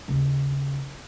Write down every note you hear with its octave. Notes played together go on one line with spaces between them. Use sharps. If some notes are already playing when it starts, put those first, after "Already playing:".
D#2 C#3